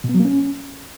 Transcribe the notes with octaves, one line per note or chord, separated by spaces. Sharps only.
B2
B3
F#3
A#3
C#4